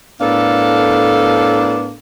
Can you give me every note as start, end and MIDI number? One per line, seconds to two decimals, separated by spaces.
0.20 1.94 45
0.20 1.94 59
0.20 1.94 62
0.20 1.94 69
0.20 1.94 70
0.20 1.94 77